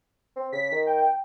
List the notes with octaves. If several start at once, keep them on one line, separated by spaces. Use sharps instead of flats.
C4
C#3 B6
D#3
G5